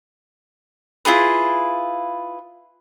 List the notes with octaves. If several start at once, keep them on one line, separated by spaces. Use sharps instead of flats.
E4 F4 G#4 B4